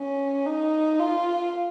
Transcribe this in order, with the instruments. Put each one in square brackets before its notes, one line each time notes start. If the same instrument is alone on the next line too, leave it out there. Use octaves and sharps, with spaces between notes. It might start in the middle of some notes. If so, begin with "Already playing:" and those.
Already playing: [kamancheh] C#4
D#4
F4